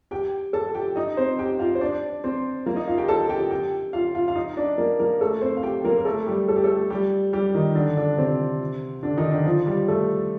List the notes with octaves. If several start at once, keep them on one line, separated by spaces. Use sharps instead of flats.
G4 G5
A4 A5
G4 G5
D#4 D#5
C4 C5
G4 G5
F4 F5
C5
D4 D5
C4 C5
A#3 A#4
D#4 D#5
F4 F5
G4 G5
A4 A5
G4 G5
G4 G5
F4 F5
F4 F5
F5
D#4 D#5
D4 D5
A#3 A#4
A#3 A#4
A3 A4
C4 C5
F5
G4 G5
A#3 A#4
A#4
A3 A4
G3 G4
A4
G4
A3 A4
G3 G4
G3 G4
D#3 D#4
D3 D4
D3 D4
C3 C4
D3 D4
D#3 D#4
D3 D4
F3 F4
G3 G4
A3 A4